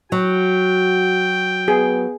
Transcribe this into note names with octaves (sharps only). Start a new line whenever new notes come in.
F#3 F#4 G5
B3 G#4